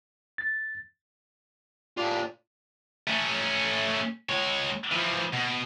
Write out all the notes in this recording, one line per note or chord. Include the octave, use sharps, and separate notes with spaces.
A6
A2 D4 F4 G4 D5
A3 C#4
G#3 C#5
E3 F3
B2